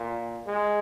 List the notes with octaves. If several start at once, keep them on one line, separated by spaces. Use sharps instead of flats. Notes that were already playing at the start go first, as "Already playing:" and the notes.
Already playing: A#2
G#3